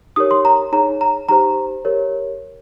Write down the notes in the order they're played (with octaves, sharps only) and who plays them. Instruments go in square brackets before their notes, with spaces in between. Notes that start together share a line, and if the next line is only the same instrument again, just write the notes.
[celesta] D#4 G4 A#4 C#5 D#6
C6
A#5
D#4 G#4 C#5 A#5
A#5
D#4 G4 C5 A#5
G4 A#4 C#5